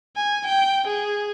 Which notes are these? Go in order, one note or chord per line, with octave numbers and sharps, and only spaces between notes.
G#5
G5
G#4